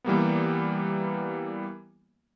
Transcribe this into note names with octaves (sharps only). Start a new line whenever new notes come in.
E3 G3 A#3 B3